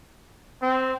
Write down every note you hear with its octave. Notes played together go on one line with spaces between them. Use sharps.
C4